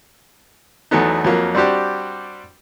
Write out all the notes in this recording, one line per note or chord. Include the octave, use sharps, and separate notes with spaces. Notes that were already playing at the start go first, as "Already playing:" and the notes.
E2 F#3 A3 B3 D#4
F2 F#3 A#3
G3 C4 D4 F#4 G4